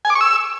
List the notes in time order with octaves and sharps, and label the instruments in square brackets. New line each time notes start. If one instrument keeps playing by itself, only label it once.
[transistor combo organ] G#5
D6
C#6
E6